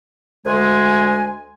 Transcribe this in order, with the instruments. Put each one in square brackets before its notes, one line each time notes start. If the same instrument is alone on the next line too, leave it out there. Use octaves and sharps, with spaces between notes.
[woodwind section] D2 G#3 G#5